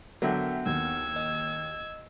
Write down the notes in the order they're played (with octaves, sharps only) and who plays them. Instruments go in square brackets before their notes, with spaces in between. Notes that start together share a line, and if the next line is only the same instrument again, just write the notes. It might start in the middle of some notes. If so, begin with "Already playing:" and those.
[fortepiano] D3 F#3 [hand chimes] B3 F#5 G6 [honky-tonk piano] A#4 E5 G5
[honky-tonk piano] D#2 D#3 [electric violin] E6 G#6
[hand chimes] D#5